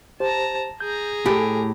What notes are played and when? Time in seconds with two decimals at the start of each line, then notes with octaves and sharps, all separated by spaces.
0.20 G4 C5 A5 A#5
0.80 G#4 A#5 G6
1.26 A2 G4 A4 G#5